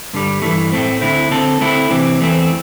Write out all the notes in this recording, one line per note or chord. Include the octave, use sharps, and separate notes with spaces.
G2 D3 G3
G2 E3 A3
A2 A3 C4
D2 D3 C4 E4
D3 C4 A4
D3 A3 C4 E4
C3 E3 C4
E2 E3 A3 C4